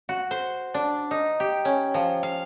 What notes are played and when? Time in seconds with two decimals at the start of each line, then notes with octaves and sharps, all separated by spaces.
0.09 F#4
0.31 C5
0.74 D4
1.11 D#4
1.40 G4
1.65 C#4
1.94 F3
2.23 F5